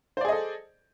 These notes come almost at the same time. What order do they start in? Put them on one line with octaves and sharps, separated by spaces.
C5 D5 G#4 D#5 A4